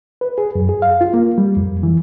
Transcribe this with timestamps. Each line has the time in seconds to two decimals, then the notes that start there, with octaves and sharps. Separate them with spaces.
0.21 B4
0.38 G#4
0.55 F#2
0.69 G#4
0.82 F5
1.01 F4
1.14 A#3
1.38 G3
1.57 F2
1.83 E3